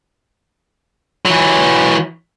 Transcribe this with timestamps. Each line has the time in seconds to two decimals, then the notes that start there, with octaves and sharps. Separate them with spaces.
1.26 E3 F#3